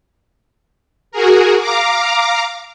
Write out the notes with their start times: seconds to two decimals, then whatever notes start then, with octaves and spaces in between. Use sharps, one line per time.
1.12 F#4 G#4 A#4
1.60 F5 A#5 D6